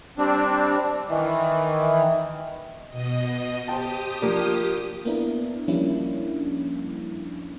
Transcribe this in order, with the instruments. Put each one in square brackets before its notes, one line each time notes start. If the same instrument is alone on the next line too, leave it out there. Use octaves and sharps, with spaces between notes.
[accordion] G3 C4 D4
D#3 E3
[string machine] B2 D#5
[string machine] G4 D#6 [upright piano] C5 G5 A5
[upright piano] F3 A#3 D4
[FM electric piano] A#3 B3 D4 E4 A#4
F3 G3 A#3 C#4 D4 E4